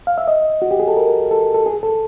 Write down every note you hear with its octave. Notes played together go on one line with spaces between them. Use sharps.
F5
E5
D#5
F#4
G4
G#4
A4
A#4
A4
A4
G#4
A4